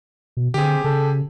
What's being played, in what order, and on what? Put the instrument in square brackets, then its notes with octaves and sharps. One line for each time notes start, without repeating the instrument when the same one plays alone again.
[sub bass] B2
[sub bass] D3 [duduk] C4 [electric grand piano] G4 G#4
[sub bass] C#3 [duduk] A4